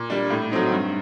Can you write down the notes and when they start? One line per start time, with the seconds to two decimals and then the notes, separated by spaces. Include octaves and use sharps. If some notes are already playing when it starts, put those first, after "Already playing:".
Already playing: A#2
0.10 G3 D4
0.30 A2
0.51 F#3 A3 C4 D#4
0.72 G2